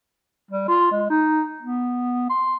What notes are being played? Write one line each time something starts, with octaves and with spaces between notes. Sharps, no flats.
G3
F4
G#3
D#4
B3
C6